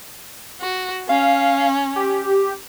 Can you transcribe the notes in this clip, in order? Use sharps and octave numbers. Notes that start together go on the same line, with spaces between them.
F#4
C#4 F5
G4